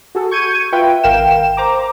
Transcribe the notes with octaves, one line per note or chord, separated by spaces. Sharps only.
F#4 G#4 A4
C#6 G6 G#6 C#7 D#7
F4 B4 E5 G5
G#1 A#4 F5 G5 E7
C5 A#5 D6